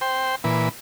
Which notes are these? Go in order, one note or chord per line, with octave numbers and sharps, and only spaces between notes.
C5 G5
A#2 E3 B4